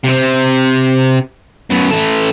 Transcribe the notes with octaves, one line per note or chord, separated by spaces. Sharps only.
C3 C4
F#2 B2
E3 A4